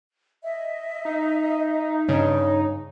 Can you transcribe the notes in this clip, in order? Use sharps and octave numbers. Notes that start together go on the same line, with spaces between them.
D#5 E5
D#4
G2 C#3 C#5